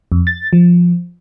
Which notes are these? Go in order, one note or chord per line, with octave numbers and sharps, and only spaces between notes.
F2
A6
F3